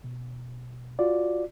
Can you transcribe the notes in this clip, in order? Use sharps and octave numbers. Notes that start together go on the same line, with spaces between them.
B2
F4 F#4 D5